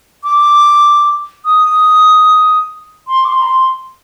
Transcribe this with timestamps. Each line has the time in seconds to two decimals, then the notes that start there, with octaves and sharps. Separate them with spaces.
0.24 D6
1.45 D#6
3.08 C6
3.25 D6
3.28 C6
3.42 A#5
3.45 C6